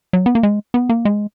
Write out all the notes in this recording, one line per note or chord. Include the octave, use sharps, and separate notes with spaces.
F#3
B3
A#3
G#3
B3
A#3
G#3